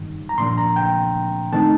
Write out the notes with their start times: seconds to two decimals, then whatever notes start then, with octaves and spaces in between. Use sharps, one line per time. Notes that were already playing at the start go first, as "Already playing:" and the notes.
Already playing: G2 D#3 G3
0.29 A#5
0.38 A#2 F3 A#3 D4 C6
0.58 A#5
0.76 G5
1.52 D#3 A3 C4 D#4 A5